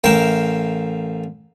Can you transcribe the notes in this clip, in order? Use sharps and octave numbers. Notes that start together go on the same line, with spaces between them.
A1 A#4 E5 F5 G5